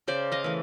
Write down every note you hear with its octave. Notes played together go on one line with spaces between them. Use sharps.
C#3 C5 D5
D#5 F5
E3 A3